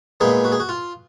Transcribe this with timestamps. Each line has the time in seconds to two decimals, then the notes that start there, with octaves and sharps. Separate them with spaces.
0.21 A#2 G#3 B3 D#4 G#4
0.45 F#4
0.52 G#4
0.60 F#4
0.69 F4